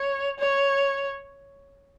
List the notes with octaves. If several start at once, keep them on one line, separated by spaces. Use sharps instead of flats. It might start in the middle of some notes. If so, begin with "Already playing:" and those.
Already playing: C#5
C#5